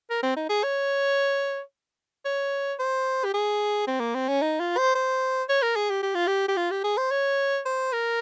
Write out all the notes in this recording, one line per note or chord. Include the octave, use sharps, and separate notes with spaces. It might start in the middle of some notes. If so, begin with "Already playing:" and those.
A#4
C4
D#4
G#4
C#5
C#5
C5
G4
G#4
C4
A#3
C4
C#4
D#4
F4
C5
C5
C#5
A#4
G#4
G4
G4
F4
G4
G4
F4
G4
G#4
C5
C#5
C5
A#4